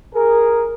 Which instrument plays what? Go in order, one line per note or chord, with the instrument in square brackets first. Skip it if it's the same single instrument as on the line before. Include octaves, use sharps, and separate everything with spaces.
[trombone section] G#4 A#4